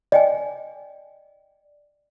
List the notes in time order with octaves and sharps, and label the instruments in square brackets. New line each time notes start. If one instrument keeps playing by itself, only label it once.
[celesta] D5 [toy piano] D#5 G5 G#5